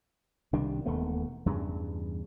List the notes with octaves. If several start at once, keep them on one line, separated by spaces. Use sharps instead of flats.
C2 D#3 G3 D4
E1 D#2 A3 B3
E2 G2 C#3